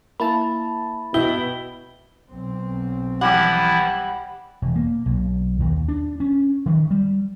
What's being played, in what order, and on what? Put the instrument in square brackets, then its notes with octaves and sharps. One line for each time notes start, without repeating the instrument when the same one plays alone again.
[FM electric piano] A#3 E4 A5 [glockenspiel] B5
[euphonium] B2 [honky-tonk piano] E4 [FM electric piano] G5 [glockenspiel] G7
[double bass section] B1 C4
[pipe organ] E3 F3 E4 [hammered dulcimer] G3 D6 [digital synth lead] F#5
[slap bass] E1
A#3
B1
D#2
D4
C#4
D#3
G3